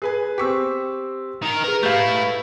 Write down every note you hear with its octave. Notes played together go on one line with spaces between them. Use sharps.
G#4 B4 G#5
C4 G4 C#6 E6 B6
D#3 A#4
G#4 A#4 B4
A3 E4 G4 B4 F5 C#6 G6